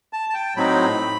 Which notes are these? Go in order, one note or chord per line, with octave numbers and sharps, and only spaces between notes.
A5
A5
G5
A2 F#3 C4 D#4 B5